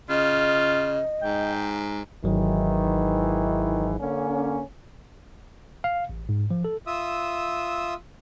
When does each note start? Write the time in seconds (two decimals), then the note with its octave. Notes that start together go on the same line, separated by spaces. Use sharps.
0.10 C#3 F4 D#5
1.22 G#2 G5
2.24 G#1 G#2 D#3 E3 F#3
3.99 D3 A#3 C#4
5.84 F5
6.09 A1
6.29 G#2
6.51 F3
6.65 A4
6.87 F4 E5 D#6 E6